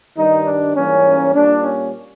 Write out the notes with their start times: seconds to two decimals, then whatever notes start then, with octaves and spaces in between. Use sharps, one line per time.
0.16 G2 D#3 G3 D#4
0.45 D4
0.74 G#2 E3 G3 A#3 C#4
1.33 A#2 G3 A#3 D4
1.62 C#4